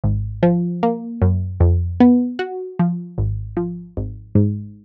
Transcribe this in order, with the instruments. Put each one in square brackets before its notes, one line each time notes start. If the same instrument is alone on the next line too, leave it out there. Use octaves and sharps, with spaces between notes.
[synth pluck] G#1
F3
A#3
F#2
F2
B3
F#4
F3
G#1
F3
G#1
G#2